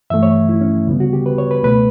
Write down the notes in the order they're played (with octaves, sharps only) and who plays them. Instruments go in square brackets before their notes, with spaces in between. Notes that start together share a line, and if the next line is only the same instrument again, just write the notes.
[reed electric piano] G2 E3 A3 E5
C#5
E4
C#4
D2 C#3 G3 B3
F#4
G4
B4
C#5
B4
C#2 B2 A3 B4